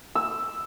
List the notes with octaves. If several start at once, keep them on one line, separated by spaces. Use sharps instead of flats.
E6